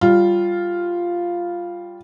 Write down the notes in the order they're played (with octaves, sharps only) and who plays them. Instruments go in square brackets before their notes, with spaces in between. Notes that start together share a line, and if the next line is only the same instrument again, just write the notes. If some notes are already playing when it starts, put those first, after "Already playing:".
[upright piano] G3 F4